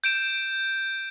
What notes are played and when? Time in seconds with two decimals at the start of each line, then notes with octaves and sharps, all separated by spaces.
0.04 G6 D7 E7